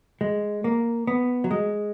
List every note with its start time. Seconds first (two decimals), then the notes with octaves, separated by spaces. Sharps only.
0.21 G#3
0.64 A#3
1.07 B3
1.44 F#3
1.51 G#3